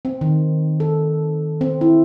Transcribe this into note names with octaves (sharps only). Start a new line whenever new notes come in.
C4
D#3
A4
C4
E4